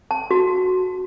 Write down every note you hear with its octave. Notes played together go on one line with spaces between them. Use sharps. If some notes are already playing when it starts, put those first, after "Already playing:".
A5
F#4